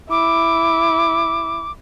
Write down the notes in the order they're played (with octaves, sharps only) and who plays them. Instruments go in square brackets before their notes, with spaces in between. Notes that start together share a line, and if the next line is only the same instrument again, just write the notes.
[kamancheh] E4 [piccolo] D6